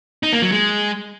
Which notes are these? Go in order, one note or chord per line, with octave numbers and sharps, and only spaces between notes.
D#4
A#3
F#3
G#3